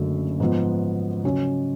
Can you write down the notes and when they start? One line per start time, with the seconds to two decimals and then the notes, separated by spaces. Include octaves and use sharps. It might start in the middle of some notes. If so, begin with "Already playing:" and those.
Already playing: F#1 F#2 D3 F#3 A3
0.40 G#2 F3 B3
1.24 C#3 F#3 C#4